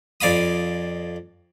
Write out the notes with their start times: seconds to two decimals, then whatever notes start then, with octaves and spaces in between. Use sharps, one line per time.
0.21 F2 D5 F5 B5 D#6